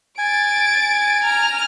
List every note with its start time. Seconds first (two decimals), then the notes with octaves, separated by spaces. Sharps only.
0.18 G#5 A6 D7
1.24 A#5 F6